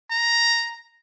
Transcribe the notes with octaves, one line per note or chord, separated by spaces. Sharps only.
A#5